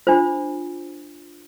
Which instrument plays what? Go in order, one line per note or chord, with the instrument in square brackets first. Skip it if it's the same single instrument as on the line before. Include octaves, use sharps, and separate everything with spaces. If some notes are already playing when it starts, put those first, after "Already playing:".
[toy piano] D4 F4 C5